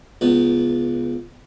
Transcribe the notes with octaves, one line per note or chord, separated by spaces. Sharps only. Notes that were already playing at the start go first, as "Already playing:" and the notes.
C#2 B3